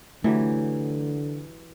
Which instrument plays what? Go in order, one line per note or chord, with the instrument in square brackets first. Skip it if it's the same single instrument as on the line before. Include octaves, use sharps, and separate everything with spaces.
[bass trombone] D3 [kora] E3 F#3 G4 [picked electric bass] A3